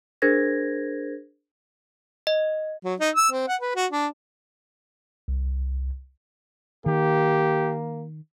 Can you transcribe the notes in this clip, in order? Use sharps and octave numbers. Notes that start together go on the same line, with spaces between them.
D4 G#4 A#4 C5 G#6 A#6
D#5
F#3
D#4
E6
C4
F#5
B4
F#4
D4
C2
D#3 A#3 G4